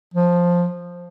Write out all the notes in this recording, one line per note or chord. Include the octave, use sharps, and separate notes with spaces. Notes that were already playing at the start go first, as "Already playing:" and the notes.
F3